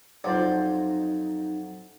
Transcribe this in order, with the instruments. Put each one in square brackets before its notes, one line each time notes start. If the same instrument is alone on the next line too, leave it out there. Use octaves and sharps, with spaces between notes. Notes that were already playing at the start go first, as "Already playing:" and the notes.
[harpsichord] F2 F#3 [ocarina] D#4 [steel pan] F4 C5 D5